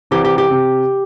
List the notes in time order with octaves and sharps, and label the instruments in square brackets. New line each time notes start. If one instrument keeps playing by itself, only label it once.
[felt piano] C2 C3 E3 G3 C4 [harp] G4
[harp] G4
G4
[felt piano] C3